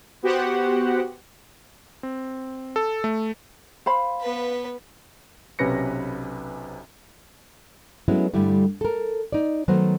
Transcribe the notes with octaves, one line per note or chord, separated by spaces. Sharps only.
B3 F#4 G4 C5 F#5
C4
A4
A3
C5 F5 B5
B3 B4
B1 C3 C#4 B4 A#6 C#7
F#3 G#3 A3 B3 C#4 E4
G2 D3 G3 A3 E4
A4 A#4
D#4 D5
D#3 F#3 A3 B3 F#4 C5